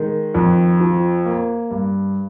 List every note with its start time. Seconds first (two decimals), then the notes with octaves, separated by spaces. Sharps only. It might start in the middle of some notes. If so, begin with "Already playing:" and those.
Already playing: D#3 G#3
0.34 F2
0.80 F3
1.26 A#3
1.71 G2